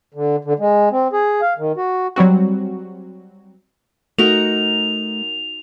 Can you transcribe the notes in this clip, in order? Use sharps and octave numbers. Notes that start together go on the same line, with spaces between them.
D3
D3
G#3
C4
G#4
F5
D#3
F#4
F#3 G3 C4 F#4
A3 D#4 F#4 A#4 F7